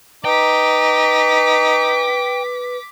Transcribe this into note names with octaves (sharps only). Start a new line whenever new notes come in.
D#4 B4 G5 D6 B6